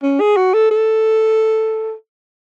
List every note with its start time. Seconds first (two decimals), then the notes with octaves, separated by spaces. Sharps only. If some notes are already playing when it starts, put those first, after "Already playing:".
0.03 C#4
0.20 G#4
0.37 F#4
0.54 A4
0.71 A4